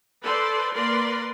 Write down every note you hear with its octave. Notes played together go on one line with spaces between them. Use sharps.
A4 B4 C5 D5 C6
A#3 A#4 B4 D5 C6